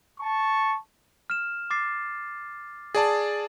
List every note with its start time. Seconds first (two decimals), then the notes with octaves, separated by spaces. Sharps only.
0.20 A5 C#6
1.30 F6 E7
1.70 D6 A6 C7
2.95 G#4 D5 A5 A6